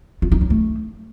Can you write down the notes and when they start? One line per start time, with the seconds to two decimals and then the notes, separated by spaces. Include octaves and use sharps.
0.22 F4
0.32 D#4
0.41 C#4
0.50 A3